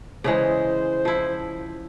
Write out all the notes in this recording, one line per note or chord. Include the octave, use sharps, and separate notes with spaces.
C#3 E3 G#3 C5
F3 E4